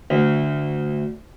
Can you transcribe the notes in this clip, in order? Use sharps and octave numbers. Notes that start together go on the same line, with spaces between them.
D2